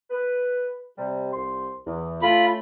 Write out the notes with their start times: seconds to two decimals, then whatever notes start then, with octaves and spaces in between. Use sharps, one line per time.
0.10 B4
0.98 C3 G3
1.33 C2 C5 C6
1.86 E2
2.22 A3 C#4 F4 A4 B5